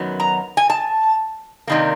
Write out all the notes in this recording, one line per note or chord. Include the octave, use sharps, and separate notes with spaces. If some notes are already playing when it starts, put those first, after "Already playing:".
Already playing: F#2 D#3 F#3 B3
A#5
G#5
A5
C3 D#3 G3 A#3